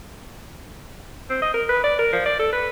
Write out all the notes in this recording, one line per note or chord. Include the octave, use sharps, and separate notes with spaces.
C4
D#5
A#4
B4
D5
A#4
F3
D5
A4
B4